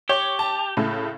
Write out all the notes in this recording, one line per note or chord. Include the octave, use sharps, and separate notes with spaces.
G4 C#5
A5
A2 C#3 A3